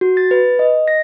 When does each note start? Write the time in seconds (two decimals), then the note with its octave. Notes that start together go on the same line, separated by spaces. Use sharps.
0.01 F#4
0.17 A6
0.31 B4
0.59 D#5
0.88 A#6